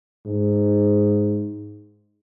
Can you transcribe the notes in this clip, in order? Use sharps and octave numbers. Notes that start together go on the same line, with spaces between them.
G#2